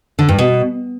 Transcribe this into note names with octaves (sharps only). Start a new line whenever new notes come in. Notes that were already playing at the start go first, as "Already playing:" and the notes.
D3
G2
B2